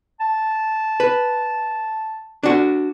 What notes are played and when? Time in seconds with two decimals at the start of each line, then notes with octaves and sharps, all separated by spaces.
0.20 A5
1.00 B4
2.43 D4 F#4